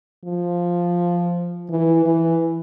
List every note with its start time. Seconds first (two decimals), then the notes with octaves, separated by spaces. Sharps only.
0.25 F3
1.70 E3
2.06 E3